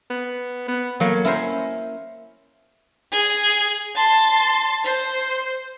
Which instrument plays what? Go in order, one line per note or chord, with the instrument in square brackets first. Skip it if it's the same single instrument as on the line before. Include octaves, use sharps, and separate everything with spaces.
[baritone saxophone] B3
B3
[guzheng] F#3 A#3 [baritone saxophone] A3
[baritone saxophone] C#4 [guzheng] E4 A#4 C5
[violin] G#4
A5 C6
C5